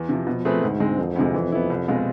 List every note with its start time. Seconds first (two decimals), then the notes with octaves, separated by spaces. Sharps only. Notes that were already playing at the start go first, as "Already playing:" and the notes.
Already playing: E2 E3
0.09 C3 F3
0.27 B2 F3
0.45 A3 C4 G#4 B4
0.63 D2 G#2
0.80 D3 G#3 C4
0.98 E1 F2
1.16 D2 C3 G#3
1.34 E3
1.52 B3 E4
1.70 C2
1.88 B2 G#3 C4 F4